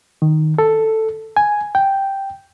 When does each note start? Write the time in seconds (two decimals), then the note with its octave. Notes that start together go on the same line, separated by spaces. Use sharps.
0.22 D#3
0.58 A4
1.37 G#5
1.75 G5